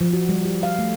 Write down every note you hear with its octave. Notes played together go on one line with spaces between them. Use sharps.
F3
F#4
G3
G4
F5
A3